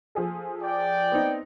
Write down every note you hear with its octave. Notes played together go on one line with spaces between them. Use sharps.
F3 G#4 A4
D5 G5
B3 C4 D#4